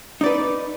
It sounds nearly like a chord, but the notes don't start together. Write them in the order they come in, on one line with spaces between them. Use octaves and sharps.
D#4 D5 B4